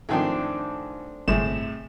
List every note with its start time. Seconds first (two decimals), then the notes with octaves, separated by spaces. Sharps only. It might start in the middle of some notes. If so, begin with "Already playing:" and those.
0.09 G#2 D#3 F3 A3 C4 D4
1.28 G1 A2 C3 G#3 E7